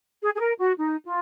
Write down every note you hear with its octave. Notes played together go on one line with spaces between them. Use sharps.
G#4
G#4
A#4
F#4
D#4
F4